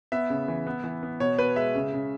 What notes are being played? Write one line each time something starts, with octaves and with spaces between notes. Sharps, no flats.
B3 E5
C#3
E3
B3
E3
B3
B2 C#5
B2 B4
G#3 E5
C#3
C#3